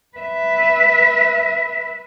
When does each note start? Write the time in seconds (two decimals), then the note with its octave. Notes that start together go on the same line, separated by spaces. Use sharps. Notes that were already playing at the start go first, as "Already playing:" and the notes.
0.17 B4 E5